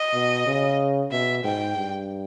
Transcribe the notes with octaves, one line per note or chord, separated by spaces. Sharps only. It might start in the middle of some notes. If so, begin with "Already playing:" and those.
Already playing: D#5
B2
C#3
B2 E5
G#2 G5
G2